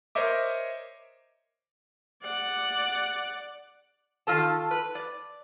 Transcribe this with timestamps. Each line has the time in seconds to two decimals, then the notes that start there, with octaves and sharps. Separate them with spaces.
0.15 A#4 C5 C#5 D#5 E5 D6
2.24 D5 F#5
4.27 D#3 F4 A4 A5
4.71 B4
4.95 D5